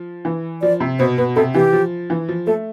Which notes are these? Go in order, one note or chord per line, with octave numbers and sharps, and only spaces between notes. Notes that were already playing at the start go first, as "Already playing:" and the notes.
Already playing: F3
E3
F3 D5
C3
B2 C5
B2 B4
C3 A4
E3 G4
F3
E3
F3
A3 A4